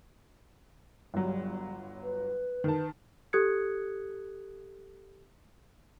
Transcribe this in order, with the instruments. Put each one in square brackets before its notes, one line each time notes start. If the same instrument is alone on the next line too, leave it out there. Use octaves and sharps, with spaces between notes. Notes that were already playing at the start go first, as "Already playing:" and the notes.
[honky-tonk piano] G1 F#3 [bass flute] G3
[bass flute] B4
[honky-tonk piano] D#3 A5
[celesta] G4 A4 D#6 F#6 G#6 C#7